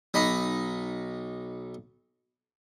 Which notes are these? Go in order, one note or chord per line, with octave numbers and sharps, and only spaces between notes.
B1 D#4 B5